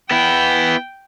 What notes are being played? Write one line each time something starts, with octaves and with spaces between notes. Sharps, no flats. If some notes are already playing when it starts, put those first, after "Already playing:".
B3 E4 G5